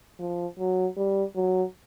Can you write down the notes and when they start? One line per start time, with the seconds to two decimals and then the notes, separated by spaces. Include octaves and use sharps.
0.19 F3
0.59 F#3
0.97 G3
1.36 F#3